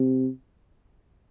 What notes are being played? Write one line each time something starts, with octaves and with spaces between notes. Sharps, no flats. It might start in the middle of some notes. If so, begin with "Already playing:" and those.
Already playing: C3